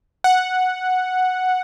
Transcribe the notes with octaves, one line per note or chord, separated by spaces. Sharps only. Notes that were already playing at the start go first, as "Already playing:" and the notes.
F#5